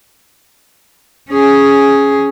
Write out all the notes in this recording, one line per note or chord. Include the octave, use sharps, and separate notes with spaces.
C#4 G#4